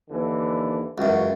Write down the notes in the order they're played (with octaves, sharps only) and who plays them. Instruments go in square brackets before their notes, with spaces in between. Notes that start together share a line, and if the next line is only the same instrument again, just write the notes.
[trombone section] D#2 D3 E3
[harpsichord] C#2 F#2 [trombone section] E3 F#4